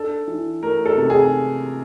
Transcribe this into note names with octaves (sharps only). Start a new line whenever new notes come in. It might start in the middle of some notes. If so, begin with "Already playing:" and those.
Already playing: D4 A4
E3
A3 A#4
A4
C3
G#4